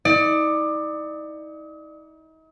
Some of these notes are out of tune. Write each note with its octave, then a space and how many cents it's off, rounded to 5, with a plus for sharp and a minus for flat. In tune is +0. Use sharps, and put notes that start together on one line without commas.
D#4 +40 D5 +25